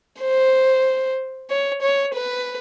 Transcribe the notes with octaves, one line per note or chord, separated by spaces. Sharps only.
C5
C#5
C#5
B4